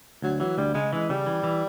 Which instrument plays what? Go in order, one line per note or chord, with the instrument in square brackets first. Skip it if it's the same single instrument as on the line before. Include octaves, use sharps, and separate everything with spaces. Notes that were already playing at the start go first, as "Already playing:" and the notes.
[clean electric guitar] D2 [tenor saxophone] F#3
[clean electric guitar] E3 [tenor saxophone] F#3
[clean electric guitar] D2 [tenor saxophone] G3
[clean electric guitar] C#3 [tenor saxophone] G#3
[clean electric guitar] E3 [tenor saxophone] G#3
[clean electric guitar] C#3 [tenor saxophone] G3
[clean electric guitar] E3
E3